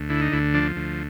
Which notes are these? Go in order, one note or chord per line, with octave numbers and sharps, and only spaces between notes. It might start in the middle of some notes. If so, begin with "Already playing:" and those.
Already playing: D2
D3 E4
D#4
D2 E4
F3 D4
D2